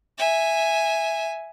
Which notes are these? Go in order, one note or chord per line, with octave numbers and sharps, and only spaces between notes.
E5 G#5